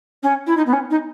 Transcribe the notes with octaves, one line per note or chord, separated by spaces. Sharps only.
C#4
E4
D#4
B3
C#4
D#4